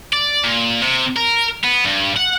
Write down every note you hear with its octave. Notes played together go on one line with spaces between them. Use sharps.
D5
A#2
C3
A#4
B3
G2
F#5